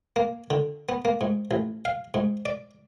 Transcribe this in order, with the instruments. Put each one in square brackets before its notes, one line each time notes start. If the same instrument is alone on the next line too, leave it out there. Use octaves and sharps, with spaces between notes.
[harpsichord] A#3
D3
B3
A#3
G#2
A1
F5
G#2
D5